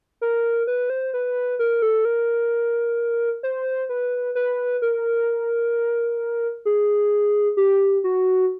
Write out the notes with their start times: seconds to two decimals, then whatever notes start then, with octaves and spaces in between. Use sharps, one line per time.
0.21 A#4
0.67 B4
0.90 C5
1.14 B4
1.59 A#4
1.82 A4
2.05 A#4
3.43 C5
3.89 B4
4.35 B4
4.82 A#4
6.65 G#4
7.57 G4
8.04 F#4